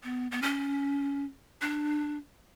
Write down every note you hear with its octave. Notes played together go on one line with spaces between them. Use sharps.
B3
B3
C#4
D4